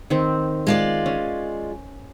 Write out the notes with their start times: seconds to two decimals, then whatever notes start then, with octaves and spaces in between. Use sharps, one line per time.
0.10 D#3 C4
0.67 G#3 F4 D5
1.06 C#4